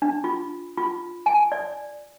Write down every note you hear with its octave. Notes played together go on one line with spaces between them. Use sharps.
D4
F4
F4
G#5
D5